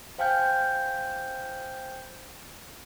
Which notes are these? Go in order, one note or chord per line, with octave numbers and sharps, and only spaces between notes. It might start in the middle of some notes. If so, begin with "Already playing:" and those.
C5 F5 G5 G#5 F6 G6